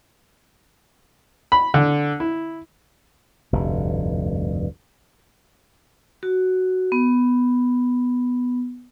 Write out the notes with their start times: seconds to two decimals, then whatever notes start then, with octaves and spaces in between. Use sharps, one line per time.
1.52 B5
1.74 D3
2.20 E4
3.53 F1 D2 G2
6.23 F#4
6.92 B3